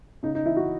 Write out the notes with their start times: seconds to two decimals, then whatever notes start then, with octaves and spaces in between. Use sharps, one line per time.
0.23 C#3 D#4
0.35 D#4
0.45 E3 E4
0.57 F#4